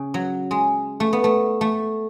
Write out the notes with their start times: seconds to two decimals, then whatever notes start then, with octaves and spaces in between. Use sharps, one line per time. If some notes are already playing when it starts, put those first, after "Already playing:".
Already playing: C#3
0.14 F#3
0.51 G#3
1.00 A3
1.13 B3
1.24 A3
1.61 A3